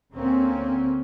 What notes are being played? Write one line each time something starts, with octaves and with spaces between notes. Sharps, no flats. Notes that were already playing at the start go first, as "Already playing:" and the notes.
D2 D3 A#3 C4 C#4